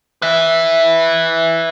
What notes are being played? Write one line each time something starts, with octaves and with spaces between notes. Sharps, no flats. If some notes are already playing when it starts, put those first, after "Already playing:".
B4 E5